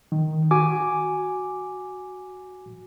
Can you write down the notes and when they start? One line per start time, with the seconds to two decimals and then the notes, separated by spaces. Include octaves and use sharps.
0.12 D#3
0.51 F#4 G#5 D6